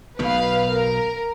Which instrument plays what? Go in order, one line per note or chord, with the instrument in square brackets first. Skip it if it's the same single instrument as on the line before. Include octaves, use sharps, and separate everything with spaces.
[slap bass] B1 B2 D#3 [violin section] B4 F5
[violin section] A#4